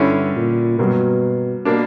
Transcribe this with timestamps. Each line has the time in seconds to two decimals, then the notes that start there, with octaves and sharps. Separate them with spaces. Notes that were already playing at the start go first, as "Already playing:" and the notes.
Already playing: G2 D3 G3 C#4 E4
0.36 A#2
0.79 G2 B2 F#3 A#3
1.65 B2 A#3 D4